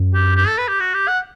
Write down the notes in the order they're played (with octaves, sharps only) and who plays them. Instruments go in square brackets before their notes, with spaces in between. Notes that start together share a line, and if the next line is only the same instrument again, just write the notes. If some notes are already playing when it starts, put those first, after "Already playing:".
Already playing: [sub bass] F#2
[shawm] G4
G4
A4
B4
G4
F#4
G4
F#5